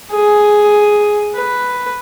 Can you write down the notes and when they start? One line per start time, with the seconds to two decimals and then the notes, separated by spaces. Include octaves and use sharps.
0.12 G#4
1.35 B4